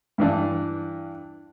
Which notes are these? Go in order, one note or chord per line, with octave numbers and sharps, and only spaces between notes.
G2 E3 D4